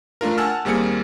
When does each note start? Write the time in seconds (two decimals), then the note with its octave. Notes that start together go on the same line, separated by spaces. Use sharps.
0.21 A3 D4 F4 A#4
0.38 F#5 G#5 A5 E6 F6
0.65 D#2 G3 A#3 C4 G#4 C#7